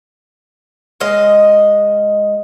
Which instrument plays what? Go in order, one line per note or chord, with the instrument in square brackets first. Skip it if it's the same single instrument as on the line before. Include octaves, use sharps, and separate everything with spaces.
[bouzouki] G#3 D#5 F5